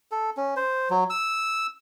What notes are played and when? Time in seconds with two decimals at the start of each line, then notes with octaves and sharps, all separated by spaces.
0.11 A4
0.37 C#4
0.56 C5
0.90 F#3
1.10 E6